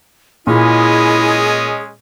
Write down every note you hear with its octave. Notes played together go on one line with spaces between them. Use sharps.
A#2 G#3 C#4 E4 G#4 D#5